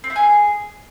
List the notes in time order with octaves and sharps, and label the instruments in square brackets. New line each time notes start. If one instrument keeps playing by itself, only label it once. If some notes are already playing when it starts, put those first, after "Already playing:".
[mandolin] C4
E4
G#4